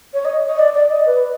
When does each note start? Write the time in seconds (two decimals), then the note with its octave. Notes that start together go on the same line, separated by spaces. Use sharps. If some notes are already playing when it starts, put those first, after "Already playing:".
0.14 C#5
0.25 D#5
0.48 D#5
0.59 D5
0.75 D5
0.91 D#5
1.06 B4